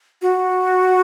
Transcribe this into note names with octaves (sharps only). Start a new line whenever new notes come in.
F#4